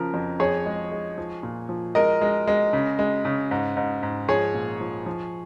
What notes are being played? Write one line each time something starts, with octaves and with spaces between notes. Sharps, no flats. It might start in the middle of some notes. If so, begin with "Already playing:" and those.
Already playing: C#3 F3 A#4
F2
F2 G#4 C#5
G#3
G#3
F3
A#2
F3
G#3 A#4 D#5
G#3
G#3
C#3
G#3
C#3
G#2
G#2
G#2
F3 G#4 C#5
A#2
F3
F3